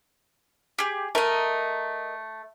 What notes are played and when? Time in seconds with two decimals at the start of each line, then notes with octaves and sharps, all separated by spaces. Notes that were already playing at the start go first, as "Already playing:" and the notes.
0.78 G4 G#4
1.15 A3 A#4 D#5